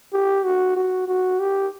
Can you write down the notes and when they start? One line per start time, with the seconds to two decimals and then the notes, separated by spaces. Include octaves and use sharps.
0.13 G4
0.45 F#4
0.76 F#4
1.08 F#4
1.40 G4